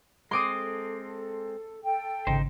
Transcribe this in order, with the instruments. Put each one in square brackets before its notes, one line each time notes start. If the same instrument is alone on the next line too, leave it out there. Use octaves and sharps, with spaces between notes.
[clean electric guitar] G#3 C4 [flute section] A4 [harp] C6 D6 D#6
[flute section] A4 G5
[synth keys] G#1 C#3 [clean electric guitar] D#4 C5